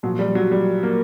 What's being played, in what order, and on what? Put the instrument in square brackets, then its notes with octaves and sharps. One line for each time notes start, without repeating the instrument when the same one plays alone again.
[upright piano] A#2 F3 F#3
G3
F#3
G3
A#3